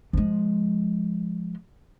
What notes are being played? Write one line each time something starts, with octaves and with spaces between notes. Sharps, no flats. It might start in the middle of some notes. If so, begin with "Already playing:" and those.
F3 G#3